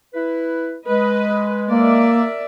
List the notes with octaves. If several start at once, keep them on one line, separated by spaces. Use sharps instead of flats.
E4 B4
G#3 B4 D#5
A#3 A#4 D5 E5